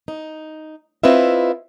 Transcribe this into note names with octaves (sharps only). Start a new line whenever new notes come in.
D#4
C4 E4 F4 B4 D#5 E5